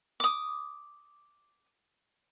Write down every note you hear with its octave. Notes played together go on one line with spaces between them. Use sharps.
D6 D#6